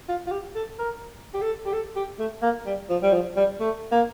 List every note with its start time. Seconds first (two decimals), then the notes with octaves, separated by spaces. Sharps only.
0.09 F4
0.27 F4
0.31 G4
0.55 A4
0.79 A#4
1.34 G4
1.42 A4
1.66 G4
1.73 A4
1.96 G4
2.20 A3
2.42 A#3
2.66 G3
2.90 F3
3.03 G3
3.13 F3
3.36 G3
3.60 A3
3.92 A#3